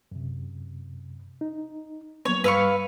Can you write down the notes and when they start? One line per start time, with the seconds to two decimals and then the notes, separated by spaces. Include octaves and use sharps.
0.12 F#2 C3
1.41 D#4
2.25 F#3 A#3 B3 C#5
2.44 G2 G3 B4 F5 C#6 E6